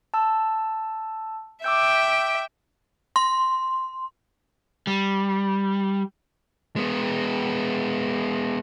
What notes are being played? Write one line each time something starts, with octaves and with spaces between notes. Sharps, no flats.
A5 E6
E5 G5 D6 E6 G6
C6
G3
G#3 B3